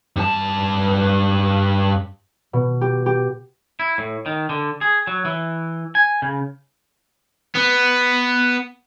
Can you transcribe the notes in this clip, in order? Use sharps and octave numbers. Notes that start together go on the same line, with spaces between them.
G2 A5
B2
G4
G4
E4
A2
D#3
D3
G#4
F#3
E3
G#5
C#3
B3